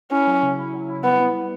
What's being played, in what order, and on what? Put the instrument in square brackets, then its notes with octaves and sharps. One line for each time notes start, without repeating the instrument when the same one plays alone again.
[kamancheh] C#4 [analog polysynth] E4
[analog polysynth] F#3
C#3
E4
F#3
E4
[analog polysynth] G3 [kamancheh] B3
[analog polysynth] B3
G3